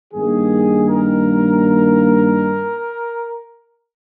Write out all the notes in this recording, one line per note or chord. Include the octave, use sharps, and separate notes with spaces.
G2 D#3 A#3 G#4
A#4